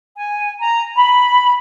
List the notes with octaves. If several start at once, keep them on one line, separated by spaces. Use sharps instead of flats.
G#5
A#5
B5